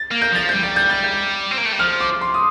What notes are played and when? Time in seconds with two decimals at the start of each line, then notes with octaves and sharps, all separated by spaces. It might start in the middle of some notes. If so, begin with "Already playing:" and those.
Already playing: A6
0.11 A#3
0.22 G6
0.32 F3 A6
0.49 G3 G6
0.63 A6
0.76 G6
0.90 A6
1.04 G6
1.51 C4
1.57 A#3
1.65 A3
1.72 G3
1.79 F3 F6
2.01 D6
2.21 C6
2.34 D#6